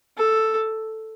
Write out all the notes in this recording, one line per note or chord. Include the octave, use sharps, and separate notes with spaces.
A4